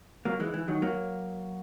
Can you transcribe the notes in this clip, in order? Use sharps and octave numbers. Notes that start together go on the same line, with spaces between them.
F#3 A#3
E3 G#3
E3
D#3 F#3
F#3 A#3